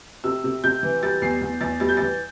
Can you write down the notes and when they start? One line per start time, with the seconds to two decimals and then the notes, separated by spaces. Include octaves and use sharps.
0.24 C3 E6
0.44 C3
0.64 C3 G6
0.83 E3
1.03 G3 A6
1.22 E2 C7
1.41 E2
1.61 E2 A6
1.80 G3 A6
1.89 G6
1.97 E3 A6